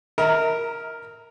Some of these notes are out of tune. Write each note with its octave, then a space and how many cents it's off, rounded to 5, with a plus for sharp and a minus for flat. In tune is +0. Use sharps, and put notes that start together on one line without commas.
A#4 +0 E5 -45 A#5 -25